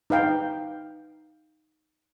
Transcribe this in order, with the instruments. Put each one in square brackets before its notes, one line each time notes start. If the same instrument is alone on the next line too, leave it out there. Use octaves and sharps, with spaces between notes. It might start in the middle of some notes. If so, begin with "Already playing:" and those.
[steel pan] D#4 B4 F5 G5